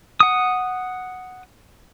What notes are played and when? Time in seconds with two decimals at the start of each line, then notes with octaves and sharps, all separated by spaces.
0.20 F#5 D#6